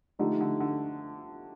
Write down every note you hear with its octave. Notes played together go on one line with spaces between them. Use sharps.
D3 F3 A3 D#4 G4
D3
D3